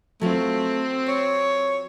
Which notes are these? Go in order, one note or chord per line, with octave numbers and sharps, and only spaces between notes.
F#3 A3 C4 F4
C#5